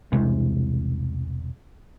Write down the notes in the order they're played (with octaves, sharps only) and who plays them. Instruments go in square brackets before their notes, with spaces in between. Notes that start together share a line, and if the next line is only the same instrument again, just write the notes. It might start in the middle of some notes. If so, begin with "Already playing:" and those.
[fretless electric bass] E1 C2 C3 G#3